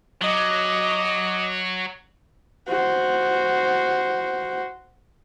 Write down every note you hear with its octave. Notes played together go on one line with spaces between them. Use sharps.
F#3 D#5 D6
F#4 C5